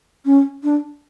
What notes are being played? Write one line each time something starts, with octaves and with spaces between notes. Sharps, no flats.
C#4
D4